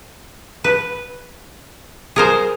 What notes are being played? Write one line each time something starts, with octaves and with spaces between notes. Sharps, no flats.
B4
G#4 A#4 C5